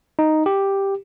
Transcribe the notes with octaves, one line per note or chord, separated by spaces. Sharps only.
D#4
G4